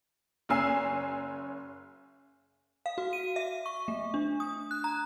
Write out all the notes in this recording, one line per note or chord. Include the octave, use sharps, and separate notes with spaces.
F#1 C#4 G#5 E6 C7
F5
F#4
D#7
E5
C#6
A3
D4
D#6
F#6
A#5